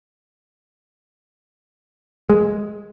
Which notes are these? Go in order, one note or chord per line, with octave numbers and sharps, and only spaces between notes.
G#3